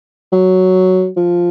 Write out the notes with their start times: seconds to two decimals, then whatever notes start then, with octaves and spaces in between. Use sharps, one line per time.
0.32 F#3
1.17 F3